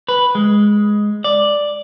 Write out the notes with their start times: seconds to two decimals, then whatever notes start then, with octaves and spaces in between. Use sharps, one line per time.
0.08 B4
0.35 G#3
1.24 D5